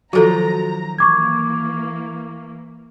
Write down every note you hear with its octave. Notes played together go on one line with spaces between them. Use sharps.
D#3 F3 F#3 F#4 A4 A#5
E3 A#3 C#6 D6 G#6